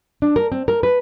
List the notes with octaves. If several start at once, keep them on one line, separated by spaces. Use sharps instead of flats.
D4
A#4
C4
A#4
B4